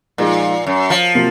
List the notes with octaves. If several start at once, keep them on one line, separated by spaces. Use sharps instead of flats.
A#2 F3 G#3 D#4 G#4
F#2
F3
C3 F#3 A#3 F4